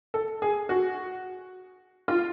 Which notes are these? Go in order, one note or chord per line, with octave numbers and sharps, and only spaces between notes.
A4
G#4
F#4
F4